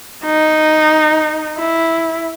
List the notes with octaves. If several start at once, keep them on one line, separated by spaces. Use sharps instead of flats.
D#4
E4